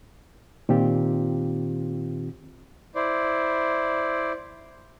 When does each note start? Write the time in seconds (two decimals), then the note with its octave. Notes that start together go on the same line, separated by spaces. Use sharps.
0.69 A#2 D#3 C4 F4 G4
2.95 E4 C5 D5